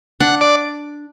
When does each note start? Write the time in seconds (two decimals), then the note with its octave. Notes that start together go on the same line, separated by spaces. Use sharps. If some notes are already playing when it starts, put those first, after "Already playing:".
0.20 D4 F#5
0.41 D5